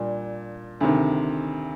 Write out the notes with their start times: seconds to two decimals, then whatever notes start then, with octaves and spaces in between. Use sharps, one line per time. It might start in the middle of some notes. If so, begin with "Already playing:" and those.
Already playing: A#2 G3 D4
0.81 D2 C3 D#3